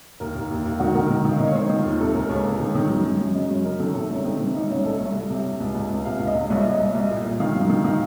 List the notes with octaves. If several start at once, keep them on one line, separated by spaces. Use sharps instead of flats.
D#2 A#4
D#2
D#2
D#2
D#3 F#4
D#3 A#4
D#3
D#3
F5
D#3 D#5
C#5
D#3 C5
D#3
F4
D#2
C3 A4
C#2 A#4
C#2 C#5
C#2
D#3
D#3
F#2
F#2
F#2
C#3 D#5
F#2 C#5
C#3 A#4
D#3 A4
C3 A4
C2 C#4
D#3 C4
D#3 C4
C2 D#4
C2 C#4
C2 A4
C2 C#5
C2
C3
C3
C#2
C#2
C#2
C3 F5
C#2
D#5
C#2
C2 C#5
C2
D#5
C2
C2
A#2
A#2
D#3 F5
F#2
D#3
D#3 F5